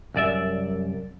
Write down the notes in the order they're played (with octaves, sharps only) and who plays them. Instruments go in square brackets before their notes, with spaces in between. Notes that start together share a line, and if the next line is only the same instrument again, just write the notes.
[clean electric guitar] C2 F#2 D5 E5